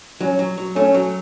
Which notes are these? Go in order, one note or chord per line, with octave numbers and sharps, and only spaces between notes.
F#3 C#4
F#3
F#3
A3 C#4
F#3